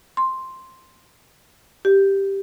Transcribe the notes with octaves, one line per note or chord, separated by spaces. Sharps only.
C6
G4